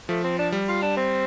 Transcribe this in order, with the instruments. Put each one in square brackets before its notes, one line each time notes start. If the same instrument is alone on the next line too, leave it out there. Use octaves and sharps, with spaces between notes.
[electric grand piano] F3 [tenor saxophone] A3
[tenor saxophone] C4
D4
[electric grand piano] G3
[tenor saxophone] F4
D4
C4